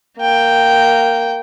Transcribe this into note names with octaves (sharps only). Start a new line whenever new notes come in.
A#3 G5